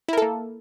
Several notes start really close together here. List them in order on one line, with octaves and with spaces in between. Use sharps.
E4 A#4 A4 A#3